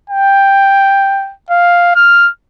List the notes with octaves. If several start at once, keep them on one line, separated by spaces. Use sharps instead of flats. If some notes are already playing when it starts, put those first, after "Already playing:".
G5
F5
F6